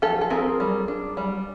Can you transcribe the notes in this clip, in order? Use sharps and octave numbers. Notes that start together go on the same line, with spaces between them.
F3 G4 A4
A4
C4 G#4 A#4
G3
D4
G3